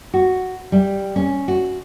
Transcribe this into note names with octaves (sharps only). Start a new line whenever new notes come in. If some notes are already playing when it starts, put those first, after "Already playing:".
F#4
G3
C#4
F#4